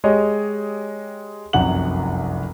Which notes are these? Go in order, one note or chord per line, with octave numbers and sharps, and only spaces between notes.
G#3 G4 C#5 D#5
F1 C2 F#2 F#5 F#7